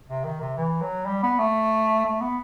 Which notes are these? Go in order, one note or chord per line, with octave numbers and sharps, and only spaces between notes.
C3
D#3
C3
E3
F#3
G3
B3
A3
A3
B3